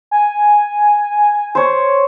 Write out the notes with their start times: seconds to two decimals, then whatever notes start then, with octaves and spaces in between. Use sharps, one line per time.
0.11 G#5
1.55 C5 C#5